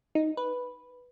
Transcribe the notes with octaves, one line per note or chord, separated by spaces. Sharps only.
D#4
B4